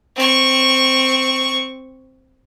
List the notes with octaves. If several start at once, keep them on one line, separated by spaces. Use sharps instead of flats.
C4 C#6